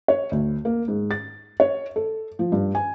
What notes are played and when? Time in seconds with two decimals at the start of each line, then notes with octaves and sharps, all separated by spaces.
0.08 C#5
0.31 D2
0.65 A#3
0.88 G#2
1.11 A6
1.60 C#5
1.96 A4
2.39 F3
2.52 G2
2.75 G#5